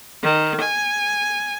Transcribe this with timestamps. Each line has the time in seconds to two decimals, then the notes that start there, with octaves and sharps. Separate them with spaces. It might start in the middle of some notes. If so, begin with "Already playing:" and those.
0.23 D#3
0.60 G#5